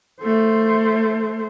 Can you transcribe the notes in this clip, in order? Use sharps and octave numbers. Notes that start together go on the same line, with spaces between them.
A3 C5